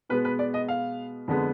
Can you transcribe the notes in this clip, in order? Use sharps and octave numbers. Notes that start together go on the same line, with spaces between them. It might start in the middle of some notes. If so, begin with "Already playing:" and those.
B2 G#3 B3 B4
B4
D5
D#5
F5
F2 D3 G#3 B3